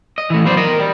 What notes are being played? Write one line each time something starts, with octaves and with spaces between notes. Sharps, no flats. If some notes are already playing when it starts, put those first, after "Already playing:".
D#5
E3 A3
F#3 B3 C5 D5
A#4 D#5
G3